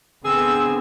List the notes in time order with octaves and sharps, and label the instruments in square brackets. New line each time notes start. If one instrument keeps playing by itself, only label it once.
[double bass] D3 B3 [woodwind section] C4 [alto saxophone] G#4 [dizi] E6